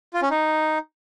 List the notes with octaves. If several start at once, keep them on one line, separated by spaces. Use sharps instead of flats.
F4
C#4
D#4